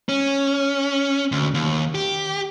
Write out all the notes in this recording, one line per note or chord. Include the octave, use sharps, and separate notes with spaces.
C#4
D2
D#2
G4